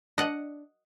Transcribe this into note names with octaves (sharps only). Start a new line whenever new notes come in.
D4 D#5 F#5